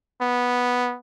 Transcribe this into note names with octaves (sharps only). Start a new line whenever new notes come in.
B3